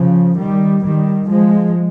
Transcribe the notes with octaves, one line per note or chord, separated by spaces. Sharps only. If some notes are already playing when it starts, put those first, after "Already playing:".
Already playing: C#3 F3
D#3 G3
D#3 G3
F3 G#3